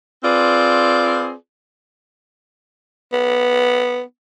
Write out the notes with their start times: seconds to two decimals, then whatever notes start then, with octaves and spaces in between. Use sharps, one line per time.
0.24 C4 F4 G#4 B4 D5
3.13 B3